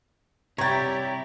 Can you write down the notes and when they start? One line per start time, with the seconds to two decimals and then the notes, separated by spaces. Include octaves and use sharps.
0.58 C3 G3 E4 G4 C#5 G5 A#5 A6